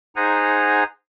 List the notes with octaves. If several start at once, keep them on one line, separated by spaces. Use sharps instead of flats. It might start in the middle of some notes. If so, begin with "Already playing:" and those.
D#4 G#4 C5 F#5 G#5 A#5